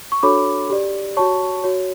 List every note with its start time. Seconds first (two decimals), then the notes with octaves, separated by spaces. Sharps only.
0.12 C#6
0.23 D4 F#4 A4 C#5 B5 D6
0.70 G4 D5
1.17 F#4 C#5 A5 C#6
1.64 F#4 C#5